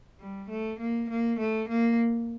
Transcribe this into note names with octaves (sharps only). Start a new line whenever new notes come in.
G3
A3
A#3
A#3
A3
A#3